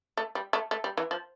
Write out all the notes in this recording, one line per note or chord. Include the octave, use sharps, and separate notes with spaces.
A3
G3
A3
A3
G3
E3
F3